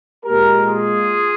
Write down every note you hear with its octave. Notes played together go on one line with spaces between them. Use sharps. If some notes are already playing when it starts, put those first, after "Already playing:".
A#2 G#3 G4 A#4
F4 G#4